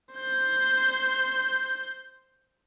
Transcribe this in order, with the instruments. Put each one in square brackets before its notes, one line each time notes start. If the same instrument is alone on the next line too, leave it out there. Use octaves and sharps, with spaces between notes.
[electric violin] C5 G6